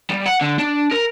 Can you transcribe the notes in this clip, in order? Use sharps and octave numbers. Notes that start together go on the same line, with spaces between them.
G3
F#5
D3
D4
A#4